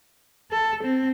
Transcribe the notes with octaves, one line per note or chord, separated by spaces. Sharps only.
A4
C4